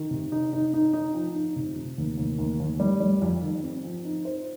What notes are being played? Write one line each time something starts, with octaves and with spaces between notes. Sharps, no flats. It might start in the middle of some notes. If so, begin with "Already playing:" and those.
Already playing: D#3
C3
D#4
D#4
D#4
D#4
F3
D#4
C3
C3
D#2
D#2
D#2
D#2
G3
G3
F2
D#3
C4
F3
D#4
C5